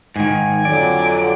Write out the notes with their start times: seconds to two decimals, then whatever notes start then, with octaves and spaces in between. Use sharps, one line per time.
0.16 G#2 D#3 G#5
0.65 F2 D3 F#3 D5